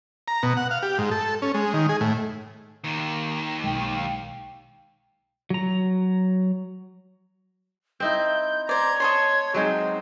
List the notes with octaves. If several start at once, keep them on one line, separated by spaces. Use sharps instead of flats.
A#5
B2
F#5
F5
G4
G#2
A4
C#4
G#3
D#3
G#4
A2
D#2 D#3
B1 G#3 G5
F#3 A#5
C4 D#4 E4 G6
C5 D5 A#5 G#6
C#5 D#5 A5 C6
F#3 G#3 C4 D#4 C5